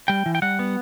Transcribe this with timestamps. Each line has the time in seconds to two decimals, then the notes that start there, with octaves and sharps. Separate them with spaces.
0.08 G3 G5
0.26 E3
0.35 G5
0.42 G3 F#5
0.59 B3